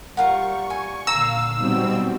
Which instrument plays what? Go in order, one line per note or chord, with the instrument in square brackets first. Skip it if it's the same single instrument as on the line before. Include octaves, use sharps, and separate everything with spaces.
[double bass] G3 [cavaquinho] F4 A#4 F#5 [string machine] C#6
[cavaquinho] G#5
[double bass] A#2 D3 [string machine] F5 [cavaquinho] A#5 [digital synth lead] E6
[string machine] B2 G3 C4 [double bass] F#3 D#4